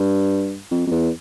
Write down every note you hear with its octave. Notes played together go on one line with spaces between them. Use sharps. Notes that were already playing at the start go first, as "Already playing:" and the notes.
Already playing: G2
F2
F2
E2